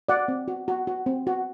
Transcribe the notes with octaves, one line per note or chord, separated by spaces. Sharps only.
F#4 D5 F#5
C4
F#4
F#4
F#4
C4
F#4